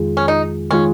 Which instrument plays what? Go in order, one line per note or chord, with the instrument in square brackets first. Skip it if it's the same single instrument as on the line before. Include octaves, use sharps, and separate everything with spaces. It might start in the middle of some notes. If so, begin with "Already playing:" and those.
Already playing: [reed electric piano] F2 D#3 G#3 F4 G#4
[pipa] C#4
D#4
[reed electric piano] D#3 G#3 F4 G#4 [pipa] C#4